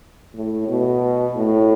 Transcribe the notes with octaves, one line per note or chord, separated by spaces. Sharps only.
A2
B2
A2